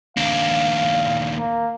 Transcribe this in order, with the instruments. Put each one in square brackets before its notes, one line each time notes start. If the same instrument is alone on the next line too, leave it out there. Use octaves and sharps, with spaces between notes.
[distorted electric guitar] D#2 D4 [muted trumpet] F5
[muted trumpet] A#3